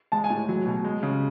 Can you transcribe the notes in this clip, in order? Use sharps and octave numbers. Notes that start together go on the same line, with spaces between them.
G#3 A5
G#5
A2
F#3
B2
G#3
C#3